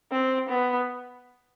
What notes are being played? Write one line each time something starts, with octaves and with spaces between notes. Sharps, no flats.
C4
B3